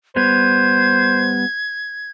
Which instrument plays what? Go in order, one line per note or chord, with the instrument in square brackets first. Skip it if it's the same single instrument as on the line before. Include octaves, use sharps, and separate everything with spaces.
[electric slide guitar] G3 B3 [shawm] C5 [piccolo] G#6